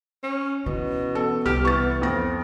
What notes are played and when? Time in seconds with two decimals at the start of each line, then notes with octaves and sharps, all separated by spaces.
0.23 C#4
0.66 B2 E3 C#4
1.15 B3 A4
1.46 C2 G4 F6
1.65 E3 C#6 A6
2.02 F2 A#6